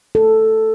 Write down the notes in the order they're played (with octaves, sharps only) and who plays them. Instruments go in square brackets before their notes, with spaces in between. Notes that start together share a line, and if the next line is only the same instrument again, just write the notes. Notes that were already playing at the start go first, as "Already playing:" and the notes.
[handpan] A4